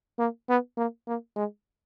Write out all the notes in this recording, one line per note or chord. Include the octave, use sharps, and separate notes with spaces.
A#3
B3
A#3
A#3
G#3